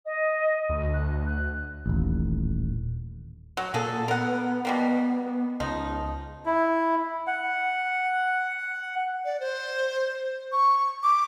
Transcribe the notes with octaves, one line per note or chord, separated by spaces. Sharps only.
D#5
D2
F#6
F#6
D#1 A1
F#3
A#2 A#3 G#4 A4
B3 A#4 F#5
B2 G3 A#3
C#2 F3 D#4
E4
F#5
D5
C5
C#6
D6